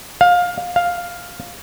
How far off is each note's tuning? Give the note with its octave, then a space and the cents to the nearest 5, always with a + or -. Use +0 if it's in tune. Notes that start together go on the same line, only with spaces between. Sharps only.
F5 +20
F5 +5